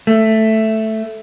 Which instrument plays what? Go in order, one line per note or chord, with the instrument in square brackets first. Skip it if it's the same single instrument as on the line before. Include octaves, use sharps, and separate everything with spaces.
[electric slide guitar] A3